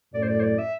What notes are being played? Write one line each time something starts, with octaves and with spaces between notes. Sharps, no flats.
F#2 A2 D5
C5
D5
C5
D5
E5